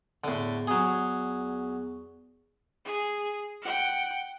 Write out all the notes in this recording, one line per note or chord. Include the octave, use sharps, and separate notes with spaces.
E2 A2 D3
F#3 G#4
G#4
F#5 G5